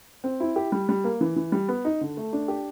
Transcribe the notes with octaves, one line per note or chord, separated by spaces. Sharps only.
C4
E4
G4
G3
G3
A#3
E3
E3
G3
B3
D#4
D3
A3
D4
G4